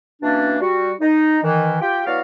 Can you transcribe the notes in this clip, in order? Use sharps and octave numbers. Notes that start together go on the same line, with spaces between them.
B2 E3 A#3 C#4 D4
G3 F#4
D#4
D#3 E3
F4 G4 G5
F#3 B3 E4 F#4 D5 F5